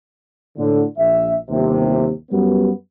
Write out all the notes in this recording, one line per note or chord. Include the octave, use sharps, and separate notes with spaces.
A2 D3
A#1 E5
G1 D#2 C3
F#2 G3 B3